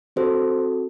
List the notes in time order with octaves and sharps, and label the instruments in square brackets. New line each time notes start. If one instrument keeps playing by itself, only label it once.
[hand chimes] C4 F#4 A4 C5